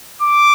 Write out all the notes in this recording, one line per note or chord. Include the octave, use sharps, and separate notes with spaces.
D6